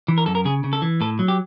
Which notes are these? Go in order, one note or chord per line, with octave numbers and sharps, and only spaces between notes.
E3
A#4
F#2 A4
A#4
C#3 G#4
C#3
A4
E3
A2 A4
F#3
G4